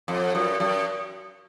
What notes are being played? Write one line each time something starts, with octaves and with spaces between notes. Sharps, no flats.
F2
F#2
F#2